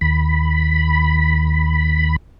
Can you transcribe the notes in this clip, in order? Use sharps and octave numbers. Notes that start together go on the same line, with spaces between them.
D#2 B5